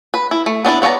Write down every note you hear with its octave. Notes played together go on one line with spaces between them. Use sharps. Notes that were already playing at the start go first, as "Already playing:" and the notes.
B4
E4
A3
B3 D4 E4 D5
B3 C#5 D5 F#5 A#5